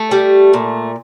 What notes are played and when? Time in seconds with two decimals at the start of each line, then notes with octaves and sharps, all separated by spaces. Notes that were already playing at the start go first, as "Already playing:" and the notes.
Already playing: A3
0.11 G3
0.54 A#2